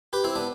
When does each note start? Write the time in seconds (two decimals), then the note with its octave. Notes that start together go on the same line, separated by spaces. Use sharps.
0.13 G4 B4
0.24 C4 E4
0.35 B3 D4